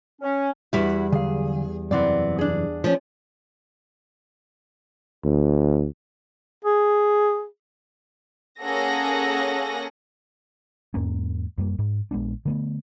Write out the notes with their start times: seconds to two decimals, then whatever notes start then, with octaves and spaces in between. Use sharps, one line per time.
0.22 C#4
0.73 E2 G3 E4 F#4
1.12 D3 F#3 G#4 F5
1.91 F#2 C3 E3 B3 C4 D5
2.39 D4 G#4
2.84 F3 C#4
5.25 D2
6.65 G#4
8.61 A#3 C#4 G#4 A4 F#5 A#6
10.94 E2 G#2 A#3 C#4
11.58 F#2 G3 A#3
11.79 G#2
12.11 A#1 G#3 B3 D4
12.45 D3 A3 B3